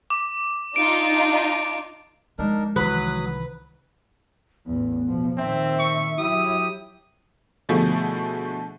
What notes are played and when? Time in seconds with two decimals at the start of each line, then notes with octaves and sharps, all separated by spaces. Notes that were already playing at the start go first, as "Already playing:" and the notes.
0.10 D6
0.76 D4 D#4 F4 D7
2.39 F3 G#3 D4 D#4 A#4
2.76 C2 D#3 E3 F#3 B4 D#6
4.66 A1 E2 B3
5.08 B2 F3
5.38 A#2 D#3 C4 E5
5.79 C#6
6.19 F#3 E4 G4 D#6
7.69 B2 D3 F3 A3 E4 G#4